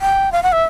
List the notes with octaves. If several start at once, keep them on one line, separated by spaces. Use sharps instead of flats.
G5
F5
F#5
E5